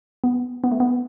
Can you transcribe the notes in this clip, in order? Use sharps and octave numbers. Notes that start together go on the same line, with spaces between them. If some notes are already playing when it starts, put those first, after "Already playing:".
B3
B3
A3
B3